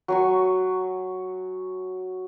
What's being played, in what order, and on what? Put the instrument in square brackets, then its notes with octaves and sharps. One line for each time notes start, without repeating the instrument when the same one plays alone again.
[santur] F#3 G#5 C#6